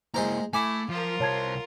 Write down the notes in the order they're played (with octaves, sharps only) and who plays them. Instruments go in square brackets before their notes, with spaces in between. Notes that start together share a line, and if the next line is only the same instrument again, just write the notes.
[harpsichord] G#3 C5 A#5 [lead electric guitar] A#3 E4
[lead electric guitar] A3 [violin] E4 [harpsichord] G#5 D6
[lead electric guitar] F3 [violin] F4 A#4
[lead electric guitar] C2 C5 [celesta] C#5 A5 G#6